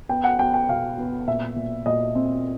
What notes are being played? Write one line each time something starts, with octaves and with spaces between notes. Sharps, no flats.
B3 G5
F#5
B3 G5
G5
B2 F5
B3
A#2 E5
A#2
A#2 D#5
C4